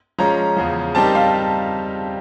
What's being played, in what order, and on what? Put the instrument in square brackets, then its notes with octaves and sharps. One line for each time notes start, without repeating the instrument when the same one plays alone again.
[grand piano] F3 G#3 C#4 [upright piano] A#5
[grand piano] E2 C#3 F3
[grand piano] G3 C4 D#4 G4 A#4 [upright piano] A5
[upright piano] F5